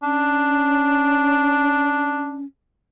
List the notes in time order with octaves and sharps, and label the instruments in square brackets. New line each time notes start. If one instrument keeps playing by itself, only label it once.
[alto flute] C#4 [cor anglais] D4